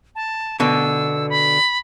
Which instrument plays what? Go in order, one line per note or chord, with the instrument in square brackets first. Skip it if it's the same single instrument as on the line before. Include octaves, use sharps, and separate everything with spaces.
[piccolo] A5
[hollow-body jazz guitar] B2 D3 [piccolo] E6
[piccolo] B5